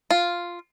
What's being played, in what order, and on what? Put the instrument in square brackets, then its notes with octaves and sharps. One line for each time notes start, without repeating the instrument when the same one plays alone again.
[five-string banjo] F4